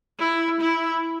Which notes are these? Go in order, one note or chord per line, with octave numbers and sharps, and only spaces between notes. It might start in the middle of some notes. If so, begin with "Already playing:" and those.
E4
E4